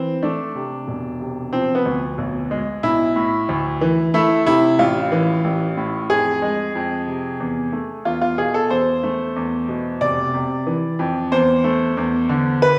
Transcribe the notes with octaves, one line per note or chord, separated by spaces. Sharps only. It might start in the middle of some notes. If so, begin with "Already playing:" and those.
Already playing: E3 C4
A3 D4
C3
E1
C3
F3 C4
B3
D2
B1
G#3
B1 E4
A2
D2
E3
A3 E4
C3 E4
A1 F4
E3
A1
A2
F2 G#4
G#3
F2
C3
E2
A3
E2 F4
F4
B2 G#4
A4
E2 C5
A3
E2
B2
F1 D5
C3
E3
F2
E2 C5
A3
E2
D3
B4